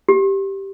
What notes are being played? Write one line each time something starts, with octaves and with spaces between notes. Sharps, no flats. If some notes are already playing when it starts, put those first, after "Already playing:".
G4